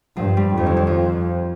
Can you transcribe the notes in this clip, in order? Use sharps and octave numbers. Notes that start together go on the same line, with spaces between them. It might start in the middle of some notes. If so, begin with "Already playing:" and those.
G2 F3
G3
F2 F3
D#3
D#3
F3